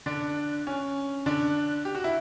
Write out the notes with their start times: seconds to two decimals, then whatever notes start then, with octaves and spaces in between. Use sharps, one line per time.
0.06 D3 D4
0.67 C#4
1.26 D3 D4
1.85 G4
1.95 F#4
2.04 E4